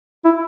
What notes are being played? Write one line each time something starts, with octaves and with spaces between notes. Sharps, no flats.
E4